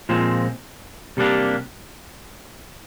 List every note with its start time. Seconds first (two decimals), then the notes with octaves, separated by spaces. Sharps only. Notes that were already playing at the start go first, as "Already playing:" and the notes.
0.09 A#2 F3 G#3 C4
1.17 C3 G3 A#3 D4 G4